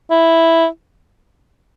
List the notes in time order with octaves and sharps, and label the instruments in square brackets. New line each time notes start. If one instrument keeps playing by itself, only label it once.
[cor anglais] E4